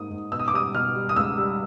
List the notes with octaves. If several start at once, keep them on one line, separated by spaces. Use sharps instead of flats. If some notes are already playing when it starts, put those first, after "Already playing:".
Already playing: G#2 A#3 D#6
G#2
B2 E6
D#6
D6
G3 D#6
B2 F6
G3
D#6
C#2 E6
G3